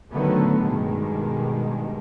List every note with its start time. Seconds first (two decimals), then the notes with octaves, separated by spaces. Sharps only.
0.13 A2 D3 D#3 F#3 A3 B3
0.62 G2 B2 D#3 G3 G#3